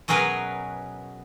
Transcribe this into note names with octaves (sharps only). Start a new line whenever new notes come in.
B2 F#3 C#4 G#4 A#4 B4